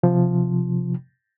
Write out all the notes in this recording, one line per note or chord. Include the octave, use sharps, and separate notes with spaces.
C3 F3